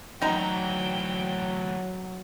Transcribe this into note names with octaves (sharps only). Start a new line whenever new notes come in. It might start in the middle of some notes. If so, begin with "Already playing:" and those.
D2 E3 F#3 D#4 G5 A#5